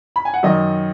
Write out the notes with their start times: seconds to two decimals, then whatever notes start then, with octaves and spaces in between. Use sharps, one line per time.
0.16 B5
0.25 G#5
0.34 F#5
0.43 F#2 D#3 D#5